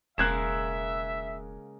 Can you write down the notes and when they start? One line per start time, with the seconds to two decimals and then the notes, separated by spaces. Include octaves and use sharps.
0.18 E1 C#3 G#3 A#3 E5 F#6 G#6 E7